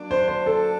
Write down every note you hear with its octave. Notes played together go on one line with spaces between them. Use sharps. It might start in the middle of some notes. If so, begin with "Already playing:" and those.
Already playing: F#3 A#3 D4
C5
C5
A4